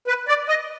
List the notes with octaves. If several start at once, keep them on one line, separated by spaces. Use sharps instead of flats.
B4
D5
D#5